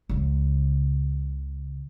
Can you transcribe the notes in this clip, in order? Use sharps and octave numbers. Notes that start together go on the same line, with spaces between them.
C#2 C#3